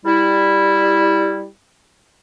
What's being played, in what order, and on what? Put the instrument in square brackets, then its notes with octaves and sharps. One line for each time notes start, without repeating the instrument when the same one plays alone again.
[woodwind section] G3 E4